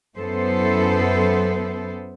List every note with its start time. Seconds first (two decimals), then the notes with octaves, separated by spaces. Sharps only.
0.18 F#2 B3 E4 A4 C5